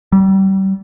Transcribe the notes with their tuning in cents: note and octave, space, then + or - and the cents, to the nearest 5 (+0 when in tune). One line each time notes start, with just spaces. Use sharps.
G3 -30